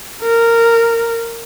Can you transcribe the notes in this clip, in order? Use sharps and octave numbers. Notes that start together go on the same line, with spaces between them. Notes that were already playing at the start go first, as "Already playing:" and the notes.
A#4